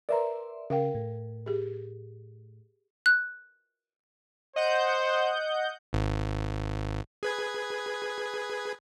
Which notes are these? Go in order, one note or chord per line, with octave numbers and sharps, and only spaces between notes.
A#4 B4 D5 E5 A#5 C6
C#3 A#4 F5 G5
A2
G4 G#4
F#6
C5 D#5 F#5 G6
G#1
G#4 B4 G#6